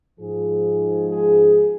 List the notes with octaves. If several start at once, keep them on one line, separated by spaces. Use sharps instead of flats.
G#2 F3 G#4
G#4